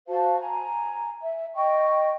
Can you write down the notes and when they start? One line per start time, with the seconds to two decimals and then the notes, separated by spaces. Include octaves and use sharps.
0.08 F#4 C5 F5 A5
0.39 G#5 A#5
1.22 E5
1.55 D#5 G5 C#6